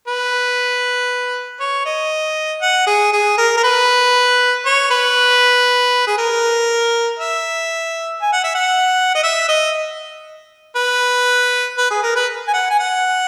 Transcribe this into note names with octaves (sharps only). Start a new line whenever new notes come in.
B4
C#5
D#5
F#5
G#4
G#4
A#4
A#4
B4
C#5
B4
G#4
A#4
E5
G#5
F#5
E5
F#5
D#5
E5
D#5
B4
B4
G#4
A#4
B4
G#5
F#5
G#5
F#5